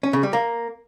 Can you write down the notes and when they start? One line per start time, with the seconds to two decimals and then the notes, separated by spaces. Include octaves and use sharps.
0.03 C#4
0.13 C#3
0.23 G3
0.33 A#3